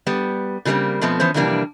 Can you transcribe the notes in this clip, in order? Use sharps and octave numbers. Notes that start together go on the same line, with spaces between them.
G3 B3
C#3 F#3 G3 A3 A#3 C4
B2 F3 A3 B3 C4
E3 F3 B3 C#4 C5
F2 C3 E3 G3 A#3 D4